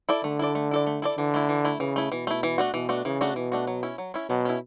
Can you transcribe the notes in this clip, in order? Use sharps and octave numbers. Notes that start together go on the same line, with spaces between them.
E4 A4 D5
D3 A3
E4 A4 D5
A3
E4 A4 D5
A3
E4 A4 D5
D3 E3
A3 E4
E3
A3 E4
C#3 E3
A3 E4
B2 E3
A3 E4
E3
A3 D4 F#4
B2 E3
A3 D4 F#4
C#3 E3
A3 D4 F#4
B2 E3
A3 D4 F#4
F#3
C#4 E4
F#3
C#4 E4
B2 F#3
C#4 E4